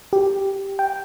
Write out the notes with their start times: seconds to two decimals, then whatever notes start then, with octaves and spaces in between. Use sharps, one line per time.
0.13 G4
0.79 G5